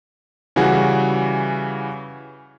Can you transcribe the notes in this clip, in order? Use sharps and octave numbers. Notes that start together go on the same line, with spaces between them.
C#3 E3 G3 F#4 G#4